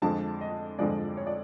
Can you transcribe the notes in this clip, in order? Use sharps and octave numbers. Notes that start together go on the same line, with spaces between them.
F2 D3 F3 G#3 A5
D#5
F2 D3 F3 G#3 D5
C#5
D5